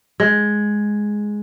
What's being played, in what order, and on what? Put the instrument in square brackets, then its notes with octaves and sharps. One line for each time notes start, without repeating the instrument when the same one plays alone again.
[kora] G#3